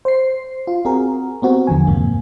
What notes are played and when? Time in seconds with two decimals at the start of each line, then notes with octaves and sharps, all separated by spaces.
0.05 C5 C7
0.67 F4
0.85 C4 F#4 G#4 A#4
1.42 B3 C4 F#4 G4 A#4
1.67 E2 D3 F3 G#5
1.87 F2 G#2 C3 A#3